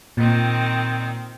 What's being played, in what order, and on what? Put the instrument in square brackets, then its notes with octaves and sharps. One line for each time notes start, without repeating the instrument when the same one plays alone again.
[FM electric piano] A#2 [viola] D#3 C4